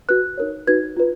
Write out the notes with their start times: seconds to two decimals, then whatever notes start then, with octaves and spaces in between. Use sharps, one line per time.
0.09 F#4 B4 F#6
0.38 D#4 A#4 C#5
0.67 D#4 F#4 B4 G#6
0.97 F4 B4